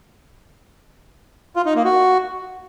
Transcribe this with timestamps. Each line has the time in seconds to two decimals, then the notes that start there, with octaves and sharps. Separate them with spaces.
1.56 F4
1.65 D#4
1.75 A#3
1.85 F#4